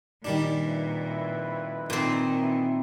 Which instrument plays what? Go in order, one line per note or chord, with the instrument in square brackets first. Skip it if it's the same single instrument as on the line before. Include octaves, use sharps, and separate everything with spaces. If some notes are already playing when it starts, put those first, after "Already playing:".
[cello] A#2 [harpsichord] D#3 G3 D4
[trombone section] F2 E4 B4
[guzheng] A#2 C4 [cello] D#3
[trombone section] E3 E4